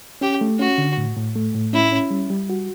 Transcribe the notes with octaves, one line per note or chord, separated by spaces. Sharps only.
C#4 G4
A3
C#4 F#4
D3
A2
A2
A3
A2
C#4 E4
C#4
G3
G3
F#4